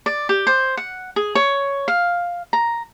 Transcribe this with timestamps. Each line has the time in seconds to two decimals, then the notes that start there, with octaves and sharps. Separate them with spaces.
0.06 D5
0.29 G4
0.47 C5
0.77 F#5
1.16 G#4
1.35 C#5
1.88 F5
2.53 A#5